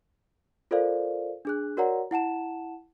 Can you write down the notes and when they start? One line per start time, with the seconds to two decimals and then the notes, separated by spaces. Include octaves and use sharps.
0.71 F4 A4 A#4 C5 D5 F5
1.45 D4 G#4 F#6
1.77 F#4 A#4 C#5 D5 F#5 A#5
2.11 E4 F#5 A5 E7